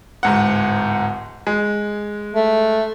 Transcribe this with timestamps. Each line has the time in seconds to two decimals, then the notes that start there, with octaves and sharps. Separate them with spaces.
0.23 D1 G#2 F#5
1.47 G#3
2.34 A3